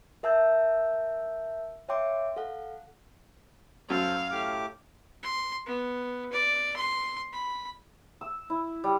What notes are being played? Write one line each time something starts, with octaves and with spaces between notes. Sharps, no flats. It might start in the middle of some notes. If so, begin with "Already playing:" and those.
A#4 E5 A5 E6 G6
C#5 E5 F5 G5 C6 D6
A4 F5 F#5
F#2 A4 C5 F5
A2 G4 D6
C6
B3
D5
C6
B5
E6
E4
G3